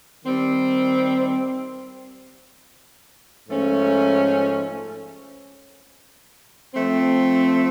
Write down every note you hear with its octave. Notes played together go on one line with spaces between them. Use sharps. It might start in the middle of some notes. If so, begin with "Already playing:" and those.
D#3 G3 C4
G#2 F3 A3 C#4
F3 A3 C4